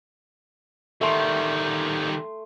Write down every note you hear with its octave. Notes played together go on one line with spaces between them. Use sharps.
D#3 G3 A3 C6